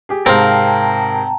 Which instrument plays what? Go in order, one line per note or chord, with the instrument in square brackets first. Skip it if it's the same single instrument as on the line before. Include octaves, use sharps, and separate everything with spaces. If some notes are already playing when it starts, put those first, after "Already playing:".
[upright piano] G4 G#4
[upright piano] G#2 C3 [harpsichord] C4 [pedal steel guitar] A#4 F5 [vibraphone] G5 A5 A#5